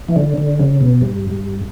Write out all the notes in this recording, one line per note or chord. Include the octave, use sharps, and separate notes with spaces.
E3
D3
D3
C#3
B2
G2
G2